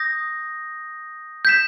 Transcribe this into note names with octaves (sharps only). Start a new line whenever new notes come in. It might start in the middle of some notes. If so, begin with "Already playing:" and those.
Already playing: D#6 G6 A#6
G6 B6 E7